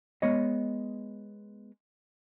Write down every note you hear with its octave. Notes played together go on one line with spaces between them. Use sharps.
G#3 B3 C#5 D#5